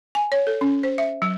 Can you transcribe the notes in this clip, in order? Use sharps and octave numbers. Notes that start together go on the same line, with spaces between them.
G#5
C#5
A4
C#4
C5
E5
F#3